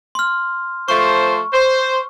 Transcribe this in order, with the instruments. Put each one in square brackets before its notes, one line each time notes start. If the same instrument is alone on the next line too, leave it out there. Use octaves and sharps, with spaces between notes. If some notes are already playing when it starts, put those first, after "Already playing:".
[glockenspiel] C6 F6
[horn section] F3 A3 C5 [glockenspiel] C#6
[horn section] C5